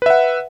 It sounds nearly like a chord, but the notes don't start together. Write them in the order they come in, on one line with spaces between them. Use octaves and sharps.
B4 E5 F#5